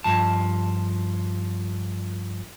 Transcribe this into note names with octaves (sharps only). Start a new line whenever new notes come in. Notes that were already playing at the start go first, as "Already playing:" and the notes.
G2 F3 A5